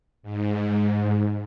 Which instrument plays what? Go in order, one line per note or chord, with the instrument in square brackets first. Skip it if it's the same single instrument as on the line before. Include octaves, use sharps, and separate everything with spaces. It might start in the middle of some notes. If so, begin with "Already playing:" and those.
[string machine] G#2